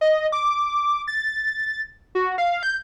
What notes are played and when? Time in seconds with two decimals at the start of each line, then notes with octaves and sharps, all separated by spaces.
0.01 D#5
0.32 D6
1.08 A6
2.15 F#4
2.38 F5
2.63 G6